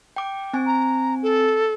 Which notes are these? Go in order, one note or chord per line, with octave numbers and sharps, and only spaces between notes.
G5 D6
C4 G#5
A#5
A4